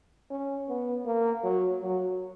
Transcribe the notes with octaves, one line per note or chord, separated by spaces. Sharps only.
C#4
B3
A#3
F#3
F#3